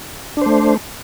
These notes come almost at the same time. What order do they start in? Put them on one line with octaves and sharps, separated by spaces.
D4 C5 A3